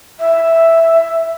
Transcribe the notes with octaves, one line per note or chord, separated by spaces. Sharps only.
E5